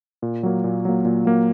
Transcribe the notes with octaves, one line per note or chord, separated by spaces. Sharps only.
A#2
F#3 A#3
A#2
F#3 A#3
A#2
F#3 A#3